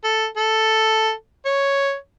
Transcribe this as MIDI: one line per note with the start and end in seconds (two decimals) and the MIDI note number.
0.04 0.26 69
0.37 1.11 69
1.45 1.95 73